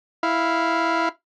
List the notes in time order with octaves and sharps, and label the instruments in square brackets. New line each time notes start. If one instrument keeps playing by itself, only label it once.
[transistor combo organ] E4 F5